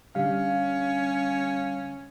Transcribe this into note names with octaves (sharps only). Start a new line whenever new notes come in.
D3 G3 C#4 F5